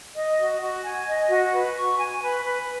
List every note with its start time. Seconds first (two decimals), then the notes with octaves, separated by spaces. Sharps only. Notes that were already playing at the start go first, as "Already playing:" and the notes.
0.16 D#5
0.39 F#4
0.61 F#4
0.84 G#5
1.08 D#5
1.30 F#4
1.53 B4
1.77 C#6
1.99 G#5
2.22 B4
2.45 B4